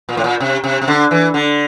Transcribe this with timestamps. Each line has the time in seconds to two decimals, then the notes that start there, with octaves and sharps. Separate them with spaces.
0.09 A#2
0.17 A2
0.24 A#2
0.40 C3
0.64 C3
0.82 C3
0.88 D3
1.11 E3
1.34 D3